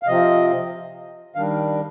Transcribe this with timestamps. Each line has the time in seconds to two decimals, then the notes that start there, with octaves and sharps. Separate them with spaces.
0.03 F5
0.07 C3 F3 C4 D#5
1.35 D#3 G3 D4 F5